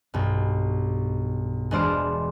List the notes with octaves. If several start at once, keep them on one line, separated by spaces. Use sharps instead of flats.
B1 G2
E1 G#3 D4 C5 F6 D7